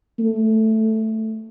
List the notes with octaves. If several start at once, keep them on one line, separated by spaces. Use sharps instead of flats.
A3